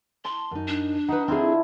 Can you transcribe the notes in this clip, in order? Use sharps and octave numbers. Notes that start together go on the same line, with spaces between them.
A5 C6
F#2 D#4
D4
D#4 B4 F#5
D3 C4 E4 F4 G#4